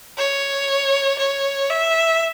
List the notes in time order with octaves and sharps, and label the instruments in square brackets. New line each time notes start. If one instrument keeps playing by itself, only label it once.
[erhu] C#5
C#5
E5